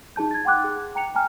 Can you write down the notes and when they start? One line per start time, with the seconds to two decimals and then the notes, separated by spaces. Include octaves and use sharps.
0.16 D#4 G#4 A5 G6
0.31 G#6 A6
0.45 F#5 G5 C6 D6 F#6
0.64 G#4
0.95 G5 A#5 C#7 F7
1.15 G5 G#5 A#5 F6